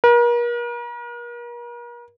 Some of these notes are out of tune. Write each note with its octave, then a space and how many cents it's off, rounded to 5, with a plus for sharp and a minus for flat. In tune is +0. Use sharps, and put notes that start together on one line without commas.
A#4 +40